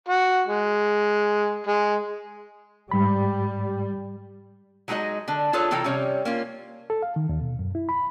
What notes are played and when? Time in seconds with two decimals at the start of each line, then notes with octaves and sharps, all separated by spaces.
0.08 F#4
0.47 G#3
1.67 G#3
2.91 G#2 G3 B5
4.88 F#3 G#3 D#4 F#4 G#4 D#5
5.28 D3 D4
5.53 D4 F4 G#4 A4 B4 C#5
5.71 C3 E3 F4 A4 G5 A#5
5.84 C3 G3 C#4 C#5
6.25 A#3 C#4 F4
6.90 A4
7.02 F5
7.16 D#3
7.29 D#2
7.41 B2
7.59 F#2
7.75 E4
7.89 B5